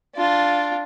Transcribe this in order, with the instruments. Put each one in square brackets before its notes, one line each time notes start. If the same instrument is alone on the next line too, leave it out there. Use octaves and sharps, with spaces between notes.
[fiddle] D4 F4